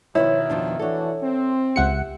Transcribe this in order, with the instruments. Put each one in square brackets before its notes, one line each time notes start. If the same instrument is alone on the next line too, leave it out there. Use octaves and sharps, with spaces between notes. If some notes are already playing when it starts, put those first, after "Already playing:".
[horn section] B2 D#3 [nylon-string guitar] F3 B4 C#5 [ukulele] E4
[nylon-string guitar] F2 F3 D4
[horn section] E3 D4 F#4 [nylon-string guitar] A4 C#5
[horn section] C4
[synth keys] C#2 F#5 C#7 [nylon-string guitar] G4 E5